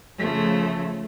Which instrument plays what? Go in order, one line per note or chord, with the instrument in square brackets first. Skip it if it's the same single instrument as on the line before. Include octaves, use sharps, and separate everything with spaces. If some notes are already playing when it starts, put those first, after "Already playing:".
[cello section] C#3 F3 A3